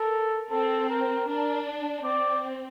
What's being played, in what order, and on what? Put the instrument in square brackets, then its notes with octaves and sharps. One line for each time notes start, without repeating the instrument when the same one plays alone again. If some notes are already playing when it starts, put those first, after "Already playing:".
Already playing: [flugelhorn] A4 [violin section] A#4
[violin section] C4 [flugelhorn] A4
[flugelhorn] A#4
[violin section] D4 [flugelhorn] A#4
[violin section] C4 [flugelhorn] D5